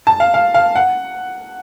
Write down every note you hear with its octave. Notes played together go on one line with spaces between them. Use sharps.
A5
F5
F5
F5
F#5